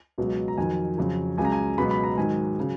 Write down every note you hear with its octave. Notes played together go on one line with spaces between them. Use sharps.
C#2 B2 F#3
A#5
F2 D#3 F#3 G#5
F2 C#3 F#3
C#2 C#3 F#3 G#5
A#5
G#5
C#2 B2 F#3 B5
B5
A#5
G#2 D#3 F#3 G#5
C#3 F#3